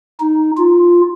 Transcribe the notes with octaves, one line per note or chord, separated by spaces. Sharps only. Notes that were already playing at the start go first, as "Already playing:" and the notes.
D#4
F4